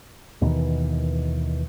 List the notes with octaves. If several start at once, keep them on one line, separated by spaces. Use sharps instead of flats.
D#2 B2 D#3 E3